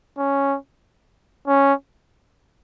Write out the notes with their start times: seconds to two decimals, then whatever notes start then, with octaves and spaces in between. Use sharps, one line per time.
0.18 C#4
1.48 C#4